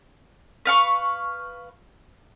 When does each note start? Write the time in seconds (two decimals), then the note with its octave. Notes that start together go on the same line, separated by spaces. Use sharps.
0.65 B4 F5 C#6